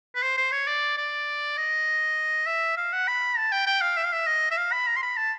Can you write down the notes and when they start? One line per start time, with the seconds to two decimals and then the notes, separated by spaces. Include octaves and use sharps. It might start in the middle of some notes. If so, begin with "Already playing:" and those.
0.15 B4
0.23 C5
0.37 C5
0.52 C#5
0.67 D5
0.98 D5
1.57 D#5
2.47 E5
2.77 F5
2.93 F#5
3.08 B5
3.38 A5
3.52 G5
3.67 G5
3.82 F5
3.97 E5
4.05 F5
4.13 E5
4.27 D#5
4.51 E5
4.57 F5
4.72 B5
4.87 A#5
4.96 C6
5.03 B5
5.17 A5